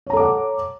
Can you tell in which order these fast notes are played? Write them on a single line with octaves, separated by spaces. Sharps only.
C#5 A#5 A4 D6 F#5